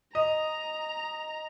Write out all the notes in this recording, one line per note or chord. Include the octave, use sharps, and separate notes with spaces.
D#5 A#5